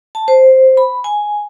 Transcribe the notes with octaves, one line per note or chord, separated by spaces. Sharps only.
A5
C5
B5
G#5